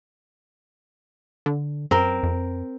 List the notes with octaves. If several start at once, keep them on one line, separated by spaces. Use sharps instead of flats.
D3
F#2 C4 A#4
F2